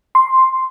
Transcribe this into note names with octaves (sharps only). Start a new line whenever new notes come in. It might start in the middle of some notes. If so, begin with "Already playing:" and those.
C6